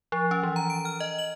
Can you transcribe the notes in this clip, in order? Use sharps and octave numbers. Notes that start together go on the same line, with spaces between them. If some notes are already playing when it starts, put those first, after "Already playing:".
F3
C#4
E3
A#5
D7
F6
D#5
F#7